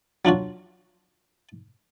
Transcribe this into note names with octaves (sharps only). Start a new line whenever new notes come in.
F#3 D4 F4 F#4